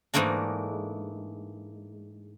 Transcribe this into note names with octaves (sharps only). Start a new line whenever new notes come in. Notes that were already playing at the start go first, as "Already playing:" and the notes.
G#2 E3 A3 A#3 D4